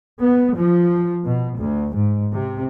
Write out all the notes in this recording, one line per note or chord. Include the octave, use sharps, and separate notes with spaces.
B3
F3
B2
D2
G#2
C3